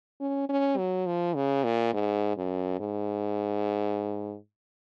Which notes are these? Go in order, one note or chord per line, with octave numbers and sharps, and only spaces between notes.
C#4
C#4
F#3
F3
C#3
A#2
G#2
F#2
G#2